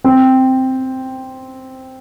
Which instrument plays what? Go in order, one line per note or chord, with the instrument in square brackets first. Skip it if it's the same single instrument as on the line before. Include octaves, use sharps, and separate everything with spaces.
[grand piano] C4